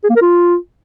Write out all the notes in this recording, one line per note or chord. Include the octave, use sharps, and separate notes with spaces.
G#4
A#3
A#4
F4